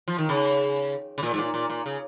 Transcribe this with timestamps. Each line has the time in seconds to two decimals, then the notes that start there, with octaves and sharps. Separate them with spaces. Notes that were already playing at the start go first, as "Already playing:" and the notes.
0.08 F3
0.19 D#3
0.29 C#3
1.18 C#3
1.23 A#2
1.34 G#2
1.38 A#2
1.54 A#2
1.70 A#2
1.86 C#3